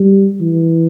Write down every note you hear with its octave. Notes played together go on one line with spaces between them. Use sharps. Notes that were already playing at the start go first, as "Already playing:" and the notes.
Already playing: G3
E3